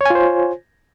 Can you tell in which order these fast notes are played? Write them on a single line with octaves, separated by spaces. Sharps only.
C#5 G#5 F4 C5